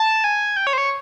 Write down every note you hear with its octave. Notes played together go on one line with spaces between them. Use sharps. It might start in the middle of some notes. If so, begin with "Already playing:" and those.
Already playing: A5
G#5
G5
C#5
C5
C#5